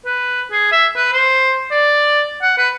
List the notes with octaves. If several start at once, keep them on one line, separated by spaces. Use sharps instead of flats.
B4
G#4
E5
B4
C5
D5
F#5
B4